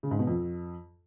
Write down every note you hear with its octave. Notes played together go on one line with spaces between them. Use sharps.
C#3
G#2
B2
F2